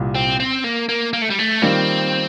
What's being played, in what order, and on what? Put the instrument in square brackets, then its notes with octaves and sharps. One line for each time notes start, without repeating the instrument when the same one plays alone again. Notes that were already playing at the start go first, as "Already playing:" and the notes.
Already playing: [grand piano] C2 A#2 G3
[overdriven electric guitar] C4
C4
A#3
A#3
A#3
A3
G3
A3
[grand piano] D#3 G3 A#3 F4 [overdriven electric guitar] C4